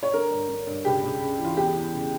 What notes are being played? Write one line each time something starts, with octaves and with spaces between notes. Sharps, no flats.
C#5
D3 A#4
G2
D3
G2
C#2 G4
C#2
C#3
E3
F4
E2 G4
E2
C#3